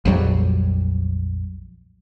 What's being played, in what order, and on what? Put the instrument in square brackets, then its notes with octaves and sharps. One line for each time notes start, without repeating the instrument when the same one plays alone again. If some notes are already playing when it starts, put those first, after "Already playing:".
[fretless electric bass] A#1 F2 F#3 G3